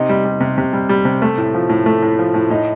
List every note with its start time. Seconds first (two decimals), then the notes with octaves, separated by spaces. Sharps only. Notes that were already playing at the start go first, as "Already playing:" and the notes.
Already playing: C3 D#4
0.09 G3
0.25 G3
0.40 C3
0.58 C3
0.73 G3
0.89 G3
1.05 C3
1.22 A3
1.38 A2
1.54 F3
1.69 A2
1.86 A3
2.02 A2
2.19 F3
2.34 A2
2.50 A2 D#4